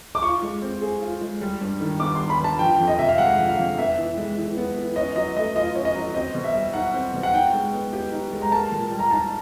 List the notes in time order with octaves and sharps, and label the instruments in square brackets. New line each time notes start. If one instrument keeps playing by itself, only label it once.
[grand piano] D6
[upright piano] F4 [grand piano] C#6
[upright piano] G#3
C4
G#4
F4
G#3
G3
G2
D#3
[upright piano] B3 [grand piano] D6
[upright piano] G3 [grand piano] C6
[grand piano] B5
[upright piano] G2 [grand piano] A5
[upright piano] F3 [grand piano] G5
[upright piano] F2
[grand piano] D#5
[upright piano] C3 [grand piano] E5
[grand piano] F5
[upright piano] G#3 [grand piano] F#5
[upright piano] F3
[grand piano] F5
[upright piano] F2
[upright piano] B3 [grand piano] E5
[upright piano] E3
G#3
E3
B3
E3
[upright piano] C#4 [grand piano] D#5
[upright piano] F#3 [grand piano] D#5
[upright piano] A3 [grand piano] D#5
[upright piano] F4 [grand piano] D#5
[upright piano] C#4
[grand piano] D#5
[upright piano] F#3
[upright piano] C4 [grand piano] D#5
[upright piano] B2
[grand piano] E5
[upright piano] G3
[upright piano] D#4 [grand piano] F#5
[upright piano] C4
B2
[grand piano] F#5
[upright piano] D#4 [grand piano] G5
[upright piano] G#3
B3
G4
D#4
G#3
[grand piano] A#5
[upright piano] A#3 [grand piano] A5
[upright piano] A#2
G3
[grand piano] A#5
[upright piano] D#4 [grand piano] A5